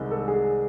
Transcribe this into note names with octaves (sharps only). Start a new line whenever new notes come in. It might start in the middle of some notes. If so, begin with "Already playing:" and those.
Already playing: C2 C3 D#3 G#3
A4
G#4